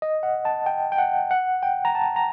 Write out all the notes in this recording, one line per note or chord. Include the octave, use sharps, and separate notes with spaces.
D#5
F#5
A5
G5
G5
F#5
F#5
G5
A#5
A5
A#5